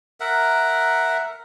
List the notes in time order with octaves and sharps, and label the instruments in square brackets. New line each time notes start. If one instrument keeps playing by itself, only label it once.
[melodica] A#4 E5 F#5